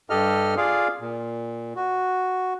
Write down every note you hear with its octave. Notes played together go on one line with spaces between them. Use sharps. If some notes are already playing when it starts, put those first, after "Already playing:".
G2 G4 A4 D#5 F6
F4 G#4 D5 F5
A#2
F#4